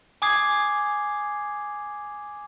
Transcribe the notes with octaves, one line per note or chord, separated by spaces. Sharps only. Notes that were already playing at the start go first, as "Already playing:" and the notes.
G#5 D6 D#6 G#6 C7